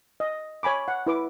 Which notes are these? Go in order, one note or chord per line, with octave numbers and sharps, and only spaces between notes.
D#5
C#5 G#5 B5 D6
F#5
E4 B4 D6